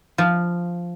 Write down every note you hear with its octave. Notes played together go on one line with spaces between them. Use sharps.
F3